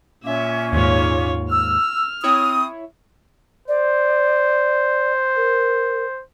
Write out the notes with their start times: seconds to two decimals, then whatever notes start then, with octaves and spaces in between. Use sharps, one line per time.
0.24 A#2 A#3 C#4 E5
0.72 D#2 G#2 F4 C#5
1.52 E6 F6
2.24 C4 E4 C#5 D#6
3.68 C5 D5
5.36 A#4